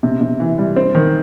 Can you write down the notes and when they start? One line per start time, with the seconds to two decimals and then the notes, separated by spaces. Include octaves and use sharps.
0.03 C3
0.21 C3
0.40 E3
0.58 G3
0.76 C4
0.95 D#3